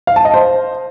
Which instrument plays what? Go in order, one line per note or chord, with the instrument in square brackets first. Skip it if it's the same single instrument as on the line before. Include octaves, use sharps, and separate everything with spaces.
[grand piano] F5
A5
D#5
C5